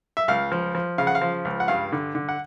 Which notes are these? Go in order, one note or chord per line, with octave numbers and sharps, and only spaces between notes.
E5
C#2 F5
F3
F3
C#3 F5
F#5
F5
F3
C#2
F#5
G2 F5
D3
D3
F#5